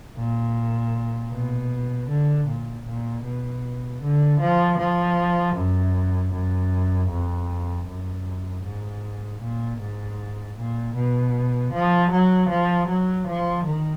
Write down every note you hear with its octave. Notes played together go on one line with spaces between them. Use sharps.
A#2
B2
D3
A#2
A#2
B2
D3
F3
F3
F#2
F#2
F2
F#2
G#2
A#2
G#2
A#2
B2
F3
F#3
F3
F#3
F3
D#3